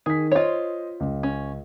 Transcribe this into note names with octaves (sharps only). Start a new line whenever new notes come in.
D#3 G#4 B6
F4 C5 C#5 D#5
C#2
C#4